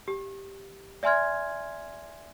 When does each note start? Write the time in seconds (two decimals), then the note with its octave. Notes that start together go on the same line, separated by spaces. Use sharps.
0.08 G4
1.03 D5 E5 G#5 C6 F6 G#6